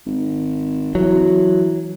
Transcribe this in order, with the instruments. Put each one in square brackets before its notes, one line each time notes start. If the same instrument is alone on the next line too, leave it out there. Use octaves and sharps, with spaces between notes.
[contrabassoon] G#1
[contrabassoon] E3 [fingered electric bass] F#3